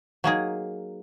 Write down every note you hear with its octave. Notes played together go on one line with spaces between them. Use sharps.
F#3 A#3 D#4 G#4